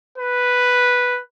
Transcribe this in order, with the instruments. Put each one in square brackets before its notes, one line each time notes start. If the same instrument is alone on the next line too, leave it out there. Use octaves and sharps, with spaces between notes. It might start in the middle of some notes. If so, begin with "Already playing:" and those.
[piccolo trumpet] B4